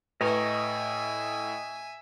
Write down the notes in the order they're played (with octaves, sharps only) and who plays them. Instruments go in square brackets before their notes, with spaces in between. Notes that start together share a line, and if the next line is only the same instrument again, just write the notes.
[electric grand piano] A2 [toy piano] B4 [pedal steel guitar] D#5 A#5 C#6 [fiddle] E5 G#5